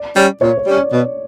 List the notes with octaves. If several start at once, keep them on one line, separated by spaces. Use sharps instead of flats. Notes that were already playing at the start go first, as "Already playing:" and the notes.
Already playing: D5
G3 C#4
A#2 C#5
C#5
G3 C#4
D5
B2